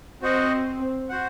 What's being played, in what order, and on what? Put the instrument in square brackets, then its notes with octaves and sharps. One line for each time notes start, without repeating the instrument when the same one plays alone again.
[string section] C4 [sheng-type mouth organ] F#4 C5 D#5 F#5
[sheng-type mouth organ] F#4 C5 F#5